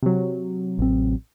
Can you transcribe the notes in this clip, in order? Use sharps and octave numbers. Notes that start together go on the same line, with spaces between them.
C3 F#3
A1 C4